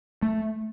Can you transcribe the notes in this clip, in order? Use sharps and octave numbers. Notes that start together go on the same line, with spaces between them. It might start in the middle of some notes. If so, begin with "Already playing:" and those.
A3